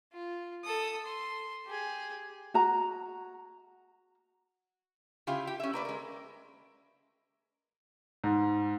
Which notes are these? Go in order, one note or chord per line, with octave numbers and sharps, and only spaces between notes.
F4
A4 D#6
C6
G4 G#4
F#4 A#5
C#3 E4 F4 G4
G4
C#4 E5
A#3 B4 D5
G#3 A#4
G#2